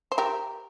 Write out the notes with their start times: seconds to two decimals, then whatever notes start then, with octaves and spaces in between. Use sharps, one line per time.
0.12 C5
0.18 G4 A#4